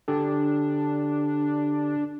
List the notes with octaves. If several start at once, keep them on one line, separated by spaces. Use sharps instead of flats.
D3 D4 G4 A4